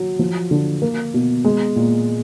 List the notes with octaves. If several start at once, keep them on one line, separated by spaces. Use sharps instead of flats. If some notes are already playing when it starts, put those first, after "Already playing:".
Already playing: F#3
F3
D3
A#3
B2
G#3
A#2